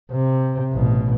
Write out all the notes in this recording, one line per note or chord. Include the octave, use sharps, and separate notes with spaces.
C3
A1 B2